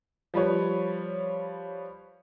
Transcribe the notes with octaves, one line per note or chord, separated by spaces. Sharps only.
F3 G3 B4 C#5